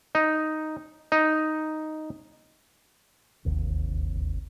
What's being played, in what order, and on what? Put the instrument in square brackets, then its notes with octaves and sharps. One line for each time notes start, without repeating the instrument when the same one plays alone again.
[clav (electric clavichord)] D#4
D#4
[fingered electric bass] D1 G#1 D#2 C3